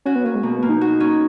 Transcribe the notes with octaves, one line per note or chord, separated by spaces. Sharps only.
C#4 F#4
B3
A#3 C#4
G#3
B2 A#3
B3
A#3
D#4
F#4
C#4